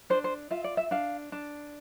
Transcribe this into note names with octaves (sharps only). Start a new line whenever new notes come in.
D4 C5
C5
F4 E5
D5
E5
D4 F5
D4